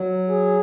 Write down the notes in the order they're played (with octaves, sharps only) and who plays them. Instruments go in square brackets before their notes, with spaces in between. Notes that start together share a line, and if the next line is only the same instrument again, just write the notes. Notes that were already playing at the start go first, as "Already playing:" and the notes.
Already playing: [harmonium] F#3
[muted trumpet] G#4